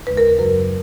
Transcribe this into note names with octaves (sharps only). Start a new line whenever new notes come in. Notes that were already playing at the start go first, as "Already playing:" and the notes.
D#2 C#3 G#3 B4
A#4
A#4
F#2 C#3 F#3 B4